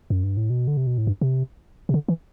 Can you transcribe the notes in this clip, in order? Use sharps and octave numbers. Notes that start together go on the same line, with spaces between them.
F#2
G2
A2
B2
D3
C3
B2
A2
G2
C3
C3
D3
E3